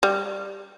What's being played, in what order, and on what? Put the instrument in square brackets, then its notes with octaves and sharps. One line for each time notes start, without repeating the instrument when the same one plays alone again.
[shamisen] G3